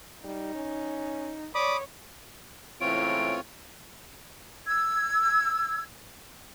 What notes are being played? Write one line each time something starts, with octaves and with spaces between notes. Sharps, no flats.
G3 D#4
C#4
C#5 D5 B5 D6 D#6
C#2 A2 E3 C4 F4 C#5 D7
E6 G#6